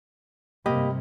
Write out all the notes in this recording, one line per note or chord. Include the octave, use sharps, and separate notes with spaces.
G2 C3 A#3 G4 D#5 B5